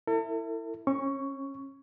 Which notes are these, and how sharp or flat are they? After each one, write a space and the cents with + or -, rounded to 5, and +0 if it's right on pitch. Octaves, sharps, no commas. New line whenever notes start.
E4 +0 A4 +45
C#4 -35 C#6 +5